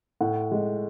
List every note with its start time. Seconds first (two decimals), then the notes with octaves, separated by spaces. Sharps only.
0.21 A2 F#5
0.51 G#3